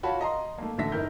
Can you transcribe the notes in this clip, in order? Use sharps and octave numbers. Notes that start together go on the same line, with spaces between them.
F4 F#4 C#5 A5 B5
D#5 A#5 C6
A3 A#3
A1 D3 A3 E5 A#6 B6
G1 D#4 E4 A#4 G6